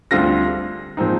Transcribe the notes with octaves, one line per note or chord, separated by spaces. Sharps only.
D2 D3 G3 C4 F4 A#6
A#2 F3 G#3 C4 D#4